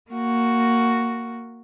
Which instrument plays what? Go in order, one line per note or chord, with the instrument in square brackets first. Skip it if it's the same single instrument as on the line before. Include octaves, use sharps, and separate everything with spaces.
[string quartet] A#3 F#4